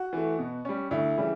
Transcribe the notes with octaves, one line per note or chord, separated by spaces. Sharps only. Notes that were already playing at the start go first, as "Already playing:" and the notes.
Already playing: F#4
E3 A3
B2
G3 C#4
D2 E4
C#3 E3 G3